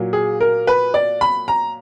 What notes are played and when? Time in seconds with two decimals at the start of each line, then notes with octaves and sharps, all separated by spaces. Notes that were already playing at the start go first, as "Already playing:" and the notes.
Already playing: A#2 F#3
0.13 G#4
0.41 A#4
0.67 B4
0.94 D5
1.21 B5
1.48 A#5